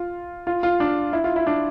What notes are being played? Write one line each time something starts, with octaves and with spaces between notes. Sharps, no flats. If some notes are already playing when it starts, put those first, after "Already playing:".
Already playing: F4
F4
F4
D4
E4
F4
E4
D4